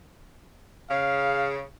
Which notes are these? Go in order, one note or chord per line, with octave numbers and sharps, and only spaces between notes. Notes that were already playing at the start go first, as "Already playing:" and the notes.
C#3 F5